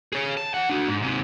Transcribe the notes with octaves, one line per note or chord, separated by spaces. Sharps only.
G#4 C#5
A5
E4 F#5
D4 F#4
G#2
G#2 C3